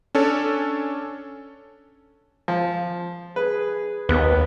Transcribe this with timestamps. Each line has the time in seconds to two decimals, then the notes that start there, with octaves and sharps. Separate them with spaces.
0.15 C#4 D4 A4 C#5
2.48 F3
3.36 G#4 B4
4.09 D#2 B3 B4